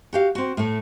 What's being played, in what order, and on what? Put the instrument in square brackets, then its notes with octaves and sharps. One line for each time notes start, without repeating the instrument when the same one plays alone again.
[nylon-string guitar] F#4 G4 F5
C4 F#4
A2 A3